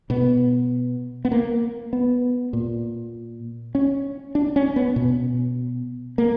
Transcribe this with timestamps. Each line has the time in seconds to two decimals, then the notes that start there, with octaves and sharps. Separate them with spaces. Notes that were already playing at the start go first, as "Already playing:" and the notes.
0.10 B2 B3
1.25 B3
1.32 A#3
1.93 B3
2.53 A#2
3.75 C#4
4.35 D4
4.56 C#4
4.76 B3
4.96 B2
6.18 A#3